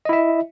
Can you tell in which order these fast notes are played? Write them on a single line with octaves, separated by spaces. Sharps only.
D#5 E4 E5